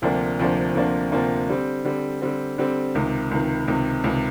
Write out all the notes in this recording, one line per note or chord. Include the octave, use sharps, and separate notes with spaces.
D2 C3 F3 A#3 D4
D2 C3 F3 A#3 D4
D2 C3 F3 A#3 D4
D2 C3 F3 A#3 D4
D3 G3 C4
D3 G3 C4
D3 G3 C4
D3 G3 C4
C#2 C3 D#3
C#2 C3 D#3
C#2 C3 D#3
C#2 C3 D#3